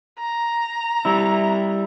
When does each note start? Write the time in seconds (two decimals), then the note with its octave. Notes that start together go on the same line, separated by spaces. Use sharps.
0.20 A#5
1.05 G3 E4